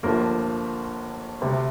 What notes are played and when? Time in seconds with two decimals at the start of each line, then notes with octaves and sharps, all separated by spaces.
0.03 G1 G2 F3 A3 A#3 A#4
1.41 D2 C3 G3